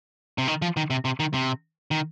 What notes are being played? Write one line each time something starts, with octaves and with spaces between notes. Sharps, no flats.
C3
D#3
F3
D#3
C3
C3
D#3
C3
D#3